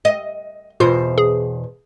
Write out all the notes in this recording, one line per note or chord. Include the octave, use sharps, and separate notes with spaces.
D#5
E2 B2 F4 C5
G#4